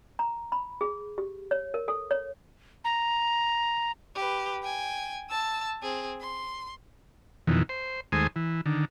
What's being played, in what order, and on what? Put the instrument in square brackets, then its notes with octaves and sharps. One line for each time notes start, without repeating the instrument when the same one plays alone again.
[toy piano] A#5
B5
G#4
G4
C#5
A#4
A4
C#5
[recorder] A#5
[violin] G4 B4
G5 G#5
A5 E6
C4 G#4
C6
[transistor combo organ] F2 B2 D#3 E3
C5
D#2 G#3 A3 C5 G#5 D#6
E3
D3 D#3